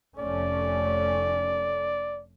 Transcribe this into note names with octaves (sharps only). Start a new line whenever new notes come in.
F1 A3 C#4 D5